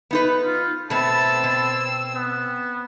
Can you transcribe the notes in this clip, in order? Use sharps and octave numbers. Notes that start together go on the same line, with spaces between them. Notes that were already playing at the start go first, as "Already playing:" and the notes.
B3 D#4 B4
F4
B2 A3 B3 C4 A5 E6
B2
B3